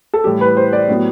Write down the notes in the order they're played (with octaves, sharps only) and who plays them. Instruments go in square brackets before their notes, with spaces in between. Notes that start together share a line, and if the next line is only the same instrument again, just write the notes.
[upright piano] A4
A2 E3 G3 G4
B4
C5
D5
A2 F#3 B3